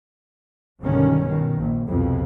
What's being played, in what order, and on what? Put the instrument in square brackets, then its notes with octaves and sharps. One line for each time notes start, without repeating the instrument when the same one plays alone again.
[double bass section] B1 G2 D3 D#3 C#4
B2 D#3
A#1 A#2
C2 F2 B2